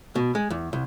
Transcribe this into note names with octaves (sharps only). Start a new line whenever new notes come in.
B2
G#3
E2
C2